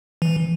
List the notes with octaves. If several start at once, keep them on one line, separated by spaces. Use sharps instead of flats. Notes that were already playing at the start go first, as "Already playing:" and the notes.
E3